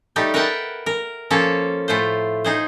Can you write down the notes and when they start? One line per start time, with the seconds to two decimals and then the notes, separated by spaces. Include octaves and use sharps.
0.16 G3 A3 D#4 G4
0.34 A#4 B4 E5 F#5 G5 A5
0.86 A#4
1.30 F3 A#3 C#4 A4
1.88 A2 A3 F4 C5
2.44 D#4 G#4 C5